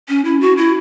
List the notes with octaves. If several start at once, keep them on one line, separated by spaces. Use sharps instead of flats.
C#4
E4
F#4
E4